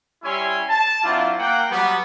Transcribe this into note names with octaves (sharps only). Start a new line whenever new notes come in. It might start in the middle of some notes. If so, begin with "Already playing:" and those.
G3 C#4 E4 C#5 G#5 C6
A5
F#3 C4 D4 E4 F4
A#3 F#5 G5
F#3 G3 B3